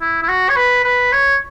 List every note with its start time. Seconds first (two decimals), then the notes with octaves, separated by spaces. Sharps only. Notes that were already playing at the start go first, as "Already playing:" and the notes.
0.01 E4
0.23 E4
0.29 F#4
0.49 C#5
0.56 B4
0.84 B4
1.12 C#5